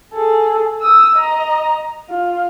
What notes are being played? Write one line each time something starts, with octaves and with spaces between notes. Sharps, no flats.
G#4 A4
D#6 E6
D#5 A#5
F4